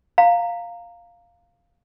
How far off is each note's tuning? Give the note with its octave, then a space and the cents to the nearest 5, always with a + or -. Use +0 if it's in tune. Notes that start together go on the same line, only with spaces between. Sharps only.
F5 +0 A#5 -15